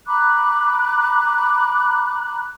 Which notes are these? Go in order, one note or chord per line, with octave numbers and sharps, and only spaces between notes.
A#5 B5 D6 F#6